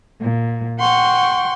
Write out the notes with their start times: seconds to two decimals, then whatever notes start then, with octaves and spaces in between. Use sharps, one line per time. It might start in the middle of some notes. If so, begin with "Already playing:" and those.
0.21 A#2
0.79 F#5 G5 C6 C#6